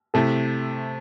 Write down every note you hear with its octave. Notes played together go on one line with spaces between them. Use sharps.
C3 A3 C4 E4 A4